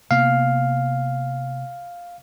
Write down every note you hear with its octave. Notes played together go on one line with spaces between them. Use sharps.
C3 A#3 B3 F5